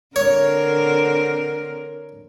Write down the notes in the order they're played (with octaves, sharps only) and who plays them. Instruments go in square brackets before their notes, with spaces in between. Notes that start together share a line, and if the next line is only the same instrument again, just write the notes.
[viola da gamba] D3 C4 A#4 [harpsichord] C#5